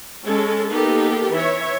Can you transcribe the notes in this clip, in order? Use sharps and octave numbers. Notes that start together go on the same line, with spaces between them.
G#3 C#4 A4
A#3 B3 D#4 G4 A4
E3 C#5 E5